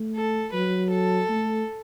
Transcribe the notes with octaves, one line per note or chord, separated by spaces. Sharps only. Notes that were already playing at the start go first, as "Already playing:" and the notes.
Already playing: A3
A4
F#3 B4
A4
A3